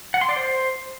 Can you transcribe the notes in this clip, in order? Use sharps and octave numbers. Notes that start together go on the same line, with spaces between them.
F#5
C6
D5
C5